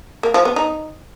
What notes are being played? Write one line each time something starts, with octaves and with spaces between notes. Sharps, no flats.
A#3
F3
B3
D#4